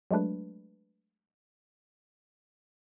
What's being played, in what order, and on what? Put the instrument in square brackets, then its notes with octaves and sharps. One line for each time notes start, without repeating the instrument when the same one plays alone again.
[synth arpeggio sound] F#3 G#3 A3 D4 B4